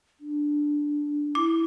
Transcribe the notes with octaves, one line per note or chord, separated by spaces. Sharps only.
D4
E4 D6